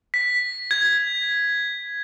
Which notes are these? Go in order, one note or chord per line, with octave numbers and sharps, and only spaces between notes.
B6
G#6